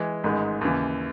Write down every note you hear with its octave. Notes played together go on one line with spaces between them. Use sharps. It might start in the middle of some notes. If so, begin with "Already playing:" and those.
Already playing: E3 G#3
A1 G#2 D#3 G#3
D#2 C#3 E3